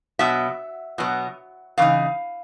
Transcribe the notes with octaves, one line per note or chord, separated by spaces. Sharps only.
B2 F#3 B3 E5
B2 F#3 B3
C#3 E3 D#4 F5